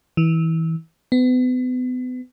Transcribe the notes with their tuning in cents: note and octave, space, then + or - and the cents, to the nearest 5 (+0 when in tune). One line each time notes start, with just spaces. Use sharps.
E3 -25
B3 +35